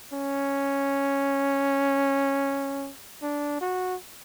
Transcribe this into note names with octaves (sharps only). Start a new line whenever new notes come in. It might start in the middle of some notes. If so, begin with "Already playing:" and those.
C#4
D4
F#4